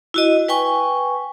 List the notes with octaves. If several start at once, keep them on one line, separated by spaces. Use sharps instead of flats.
E4 F#4 D#5
B4 G5 G#5 C#6